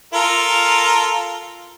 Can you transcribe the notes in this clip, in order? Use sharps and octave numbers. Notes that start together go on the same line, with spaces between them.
F4 A4 A#4